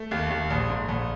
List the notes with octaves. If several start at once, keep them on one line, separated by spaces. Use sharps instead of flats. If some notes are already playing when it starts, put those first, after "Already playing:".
Already playing: A3
D#2
D#2
A#1
G#2
A#1